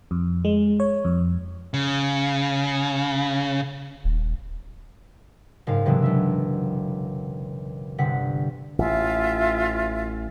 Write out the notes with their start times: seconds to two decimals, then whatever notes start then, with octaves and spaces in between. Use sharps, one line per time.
0.11 F2
0.45 G#3
0.80 C#5
1.05 F2
1.74 C#3
4.04 D#1
5.67 F#1 G#2 F5
5.86 C3 E3 F#3 G#3 B3 D4
6.02 B1 E5 E6
7.98 G1 C3 F#5 B6
8.79 A1 F4 E5